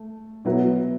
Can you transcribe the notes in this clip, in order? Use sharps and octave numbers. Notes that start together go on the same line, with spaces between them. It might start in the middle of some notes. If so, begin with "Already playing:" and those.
Already playing: A3
B2 F#3 B3 E4 B4